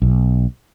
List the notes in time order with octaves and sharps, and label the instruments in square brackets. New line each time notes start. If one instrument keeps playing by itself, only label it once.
[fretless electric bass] B1